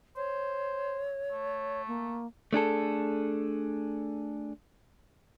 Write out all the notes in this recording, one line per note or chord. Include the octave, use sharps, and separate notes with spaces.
C5 C#5
A3
A#3
A3 D4 G#4 A4